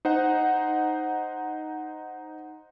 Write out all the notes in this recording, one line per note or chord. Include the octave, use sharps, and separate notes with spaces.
D#4 C5 F#5